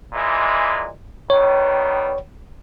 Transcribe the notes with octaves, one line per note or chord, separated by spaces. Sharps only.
A#2 E3 G#3
D#3 G3 B3 C#5